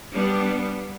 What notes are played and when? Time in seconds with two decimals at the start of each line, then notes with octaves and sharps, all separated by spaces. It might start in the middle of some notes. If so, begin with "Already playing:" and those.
0.14 G3 B3 D4